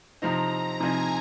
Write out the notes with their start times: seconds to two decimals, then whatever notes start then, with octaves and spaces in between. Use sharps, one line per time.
0.22 C3 F3 C4 D#4 A#5
0.80 C3 F3 C4 D#4 G#5